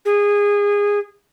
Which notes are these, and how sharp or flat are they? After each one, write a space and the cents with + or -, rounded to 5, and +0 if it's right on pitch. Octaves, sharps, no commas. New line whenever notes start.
G#4 -20